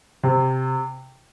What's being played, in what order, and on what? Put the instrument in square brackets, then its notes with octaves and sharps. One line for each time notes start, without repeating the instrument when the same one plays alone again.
[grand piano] C3